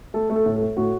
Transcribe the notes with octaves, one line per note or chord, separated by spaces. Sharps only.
A3 A4
A3
A4
A2
A4
A3
A2 F#4